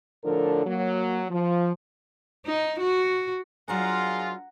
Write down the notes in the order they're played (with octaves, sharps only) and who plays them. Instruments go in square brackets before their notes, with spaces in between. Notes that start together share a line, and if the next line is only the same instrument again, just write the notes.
[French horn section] A2 D3 F3 D4 A4 A#4
F#3 A#3
F3
[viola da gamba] D#4
F#4
[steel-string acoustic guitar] F#3 D4 A#4 [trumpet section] F4 [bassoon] G#4 [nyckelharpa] F#5 A#5